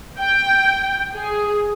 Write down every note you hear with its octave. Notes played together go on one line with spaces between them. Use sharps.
G5
G#4